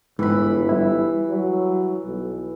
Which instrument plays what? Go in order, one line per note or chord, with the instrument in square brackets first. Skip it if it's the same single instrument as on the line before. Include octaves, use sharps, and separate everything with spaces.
[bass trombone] G1 [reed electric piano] G#2 [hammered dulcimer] E3 B5
[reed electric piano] G3 E4
[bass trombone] F#3
B1